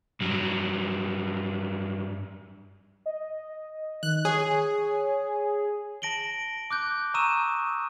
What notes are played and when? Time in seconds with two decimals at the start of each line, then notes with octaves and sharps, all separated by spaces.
0.21 G2 F#3
3.06 D#5
4.03 D#3 F#6
4.25 G#4 C#5
6.02 A5 A#6 D7 F#7 G7
6.71 D6 F#6 G6
7.14 A#5 C#6 D#6 E6 D#7 E7